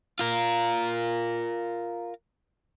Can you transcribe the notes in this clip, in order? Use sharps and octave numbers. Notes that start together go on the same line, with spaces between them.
F4 A#4